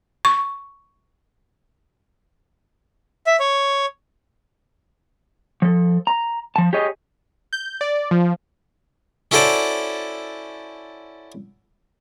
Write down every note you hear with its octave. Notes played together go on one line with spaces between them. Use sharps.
C#6
E5
C#5
F3 A4
A#5
F3 A5
G4 G#4 C#5 D#5
G6
D5
F3
C#4 E4 F#4 A4 C5 D5